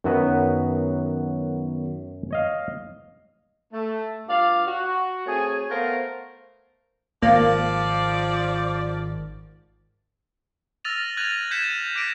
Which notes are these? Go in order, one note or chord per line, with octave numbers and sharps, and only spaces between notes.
F#2 D#3 F#3 B3 F#4 B4
C#5 D#5 F5
A3
G2 F4 D5 F5
F#4
A3 C4 G#4 C#5 G#5
A3 B3 A#4 C5 F5
G#1 F3 A#3 D5
E6 F6 A6 A#6 D#7 F7
F#6 G#6 A#6 D#7 F7 F#7
G6 G#6 B6 C#7 D#7 E7
D6 G6 A#6 B6 D7 D#7